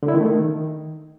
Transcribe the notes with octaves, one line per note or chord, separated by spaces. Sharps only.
D3
E4
D#3
A3
D#3